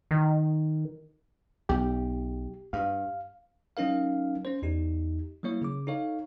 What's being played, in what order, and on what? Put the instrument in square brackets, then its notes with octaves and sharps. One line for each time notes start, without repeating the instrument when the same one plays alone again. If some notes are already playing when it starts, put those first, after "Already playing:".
[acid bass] D#3
[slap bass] B1 [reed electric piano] G4
[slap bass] G2 [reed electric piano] F5
[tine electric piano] F#3 C#4 D#4 A#4 F5
C#4 C5
E2 D#4 G4
F#3 G3 A#3 E4 C#5
C#3 D6
D#4 A4 C#5 F5